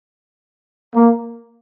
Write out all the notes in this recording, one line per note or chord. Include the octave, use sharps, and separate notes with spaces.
A#3